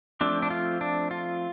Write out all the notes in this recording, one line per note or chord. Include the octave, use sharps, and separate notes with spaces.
F3 A3 C4 D4
D4
F4
D4
F4